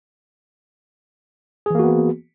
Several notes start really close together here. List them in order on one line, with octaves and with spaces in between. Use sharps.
G#4 E3 A#3 F#4 B3